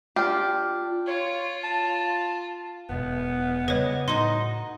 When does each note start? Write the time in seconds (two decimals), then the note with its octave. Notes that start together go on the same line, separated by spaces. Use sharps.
0.16 D4 F4 G4
1.07 F4 C#5
1.64 A5
2.90 E1 B2 B3
3.68 C#3 G3 B4 C#5 D#5
4.08 A2 D#4 F#4 D#5 C6